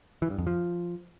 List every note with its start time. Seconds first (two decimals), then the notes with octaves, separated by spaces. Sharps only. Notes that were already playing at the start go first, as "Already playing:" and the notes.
0.22 E3
0.30 G2
0.38 F2
0.47 F3